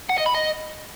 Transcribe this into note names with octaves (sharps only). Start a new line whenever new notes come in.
F#5
D#5
B5
D#5